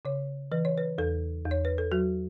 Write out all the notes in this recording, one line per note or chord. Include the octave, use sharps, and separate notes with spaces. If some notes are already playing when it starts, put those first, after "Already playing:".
C#3 C#5
E3 B4
C#5
B4
E2 A4
E2
C#5
B4
A4
F#3 F#4